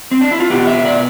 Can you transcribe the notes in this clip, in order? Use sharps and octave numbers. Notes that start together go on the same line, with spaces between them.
C4
D4
E4
F4
B2 B3 G4
E5
D5